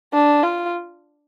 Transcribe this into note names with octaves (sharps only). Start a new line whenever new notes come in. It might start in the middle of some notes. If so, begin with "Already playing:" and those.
D4
F4